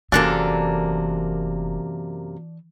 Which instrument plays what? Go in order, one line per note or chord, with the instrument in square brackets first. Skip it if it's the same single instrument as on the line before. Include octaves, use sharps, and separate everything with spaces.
[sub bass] F1 [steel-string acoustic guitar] F#2 C3 A#3 [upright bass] E3 [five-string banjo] D4 A4